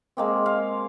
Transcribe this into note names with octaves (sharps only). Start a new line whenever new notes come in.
G#3 A#3 C4
F5